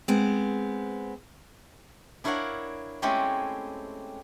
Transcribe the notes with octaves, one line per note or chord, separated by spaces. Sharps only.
G#3 B3 C4
D4 E4 A#4 C#5 F5 F#5
G#3 A3 C4 C#4 E4 G4